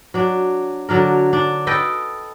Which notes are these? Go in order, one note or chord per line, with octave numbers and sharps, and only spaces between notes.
F#3 D4
D3 F#3 D4 A#4
D4
A4 B4 D#5 G5